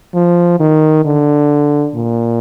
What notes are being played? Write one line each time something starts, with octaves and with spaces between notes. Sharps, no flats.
F3
D#3
D3
A#2